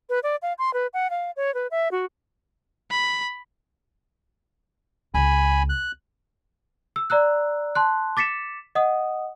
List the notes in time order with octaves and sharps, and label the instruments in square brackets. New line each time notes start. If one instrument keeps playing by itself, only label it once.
[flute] B4
D5
F5
C6
B4
F#5
F5
C#5
B4
E5
F#4
[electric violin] B5
[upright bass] C#2 [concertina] G#5 B5
[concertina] F#6
[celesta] E6
D5 A#5 E6 F#6
A5 C6 F#6
D6 A6 B6 C#7 E7
D#5 F#5 D#6